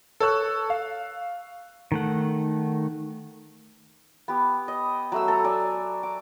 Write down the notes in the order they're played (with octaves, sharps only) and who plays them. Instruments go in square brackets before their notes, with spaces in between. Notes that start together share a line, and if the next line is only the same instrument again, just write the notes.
[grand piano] A4 C#5 C#6 E6 F#6
F5
[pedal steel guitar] D#3 A3 F#5
[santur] B3 G4
D#5
F#3 A3 E6
A4 A#5
D5 G#5
D6